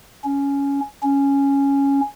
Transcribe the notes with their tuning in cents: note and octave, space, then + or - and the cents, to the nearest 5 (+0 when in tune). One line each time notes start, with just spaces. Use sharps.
C#4 +10
C#4 +0